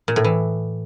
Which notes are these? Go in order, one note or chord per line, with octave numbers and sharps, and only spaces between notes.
A#2
A2
E3